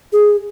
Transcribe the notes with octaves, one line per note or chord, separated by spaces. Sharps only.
G#4